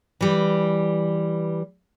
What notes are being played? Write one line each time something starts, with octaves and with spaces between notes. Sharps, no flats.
E3 G3